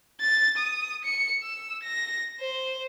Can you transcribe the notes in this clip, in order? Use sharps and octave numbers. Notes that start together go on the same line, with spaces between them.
A6
D#6
C#7
E6
A#6
C5